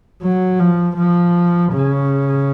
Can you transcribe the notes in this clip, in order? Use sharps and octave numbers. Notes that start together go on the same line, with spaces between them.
F#3
F3
F3
C#3